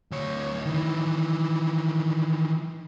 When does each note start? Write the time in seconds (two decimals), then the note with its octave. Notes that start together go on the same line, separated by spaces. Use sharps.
0.11 D2 C#5
0.65 D#3 E3